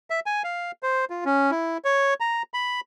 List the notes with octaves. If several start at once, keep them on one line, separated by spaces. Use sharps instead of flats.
E5
G#5
F5
C5
F4
C#4
E4
C#5
A#5
B5